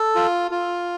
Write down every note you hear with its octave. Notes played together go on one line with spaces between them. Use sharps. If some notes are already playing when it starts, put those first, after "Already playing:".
Already playing: A4
F4
F4